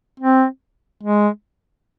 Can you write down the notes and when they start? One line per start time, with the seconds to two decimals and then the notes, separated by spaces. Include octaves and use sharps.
0.20 C4
1.03 G#3